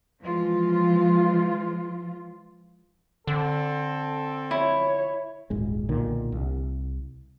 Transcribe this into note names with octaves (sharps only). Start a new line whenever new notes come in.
E3 F3 G#3 F4
D3 C4 A4
E4 C#5
D#1 G#1 G#3
B1 A#2 D3 D#3
C2